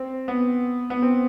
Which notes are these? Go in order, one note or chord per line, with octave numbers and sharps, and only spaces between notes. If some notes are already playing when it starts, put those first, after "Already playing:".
Already playing: C4
B3
B3
C4